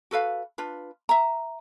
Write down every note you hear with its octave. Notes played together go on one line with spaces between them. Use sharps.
F#4 A4 B4 F5
D4 F4 B4
E5 A#5